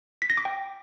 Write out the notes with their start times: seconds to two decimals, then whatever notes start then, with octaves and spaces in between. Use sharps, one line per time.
0.22 B6
0.30 A#6
0.37 D6
0.45 G5